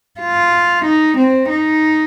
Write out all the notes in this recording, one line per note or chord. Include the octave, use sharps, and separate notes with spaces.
F4
D#4
C4
D#4